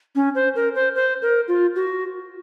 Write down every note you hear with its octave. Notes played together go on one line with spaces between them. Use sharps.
C#4
C5
A#4
C5
C5
A#4
F4
F#4